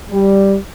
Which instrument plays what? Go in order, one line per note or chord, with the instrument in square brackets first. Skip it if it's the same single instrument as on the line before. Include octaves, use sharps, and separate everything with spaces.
[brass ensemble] G3